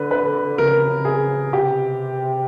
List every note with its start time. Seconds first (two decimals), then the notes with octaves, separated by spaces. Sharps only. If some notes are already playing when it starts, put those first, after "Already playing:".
Already playing: D3 B4
0.11 B4
0.58 C#3 A#4
1.05 G#4
1.52 C3 G4